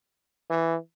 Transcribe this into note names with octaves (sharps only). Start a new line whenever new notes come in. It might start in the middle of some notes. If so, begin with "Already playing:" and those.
E3